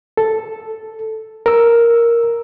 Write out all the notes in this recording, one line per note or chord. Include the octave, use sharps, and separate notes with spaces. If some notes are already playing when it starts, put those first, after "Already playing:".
A4
A#4 E6